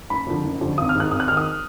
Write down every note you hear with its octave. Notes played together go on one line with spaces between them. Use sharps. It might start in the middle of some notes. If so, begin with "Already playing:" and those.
F#1 B5
F2 D3 F3
F#1
F2 D3 F3
G#1 D#6
F6
G#2 D#3 F#6
G#1 D#6
F#6
G#2 D#3 F6
D#6